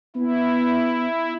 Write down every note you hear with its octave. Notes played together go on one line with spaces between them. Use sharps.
B3 E4